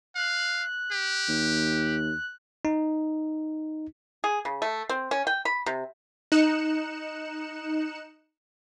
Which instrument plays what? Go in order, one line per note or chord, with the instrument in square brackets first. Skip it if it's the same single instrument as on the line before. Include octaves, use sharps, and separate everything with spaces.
[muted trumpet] F5 [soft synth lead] F#6
[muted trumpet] G4
[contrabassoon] D#2
[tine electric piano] D#4
[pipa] G#4
C#3
A3
C4
C#4
G5
B5
C3
[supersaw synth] D#4 F#6 C#7 E7